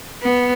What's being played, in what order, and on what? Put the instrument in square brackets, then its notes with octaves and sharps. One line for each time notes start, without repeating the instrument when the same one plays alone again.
[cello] B3